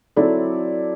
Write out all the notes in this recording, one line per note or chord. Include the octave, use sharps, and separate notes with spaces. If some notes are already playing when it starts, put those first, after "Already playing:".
F#3 C4 E4 A4 D5